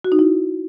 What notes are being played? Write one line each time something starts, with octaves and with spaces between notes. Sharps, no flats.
F#4
D#4
E4